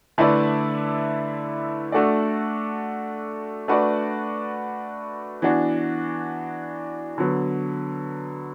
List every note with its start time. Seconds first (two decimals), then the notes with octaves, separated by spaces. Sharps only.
0.18 D3 A3 E4 B4 D5
1.92 A3 D4 F#4 A4 D5
3.68 A3 D4 F#4 B4 D5
5.42 E3 B3 D4 F#4
7.18 D3 F#3 B3